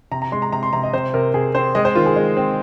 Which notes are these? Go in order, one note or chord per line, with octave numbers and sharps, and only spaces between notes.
C3 A#5
A#5
G#3 C6
A#5
C3 A#5
C6
C3 A#5
D#5
C3 C5
C3 A#4
C3 G#4
C4 C5
G#3 D#5
C5
D#3 F4
G#4
G#3
C4